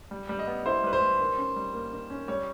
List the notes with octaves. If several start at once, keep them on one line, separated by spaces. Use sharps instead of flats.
G3
G3
D#5
B3
E4 C5
G3 B4
C5
G3
D#3
C#4
G3
A#3
D#3
C#4
G3 C#5